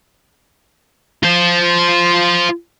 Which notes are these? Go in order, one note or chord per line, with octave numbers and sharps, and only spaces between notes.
F4 C5